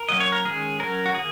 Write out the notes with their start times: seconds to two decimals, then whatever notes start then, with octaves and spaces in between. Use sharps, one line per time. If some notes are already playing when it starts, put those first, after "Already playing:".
Already playing: A#4
0.09 F#3 A#3 C#4 D#5
0.20 C#5
0.32 A#4
0.45 D#3 G#3 C#4 G#4
0.80 F#3 C#4 A#4
1.06 F#4
1.14 D#3 A#3 G#4